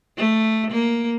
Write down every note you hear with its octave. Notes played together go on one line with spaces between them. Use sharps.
A3
A#3